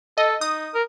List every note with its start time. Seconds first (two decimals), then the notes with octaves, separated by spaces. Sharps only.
0.18 A4 D#5
0.41 D#4 D#6
0.74 A#4